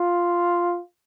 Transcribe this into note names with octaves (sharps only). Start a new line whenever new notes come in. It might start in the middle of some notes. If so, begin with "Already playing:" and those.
Already playing: F4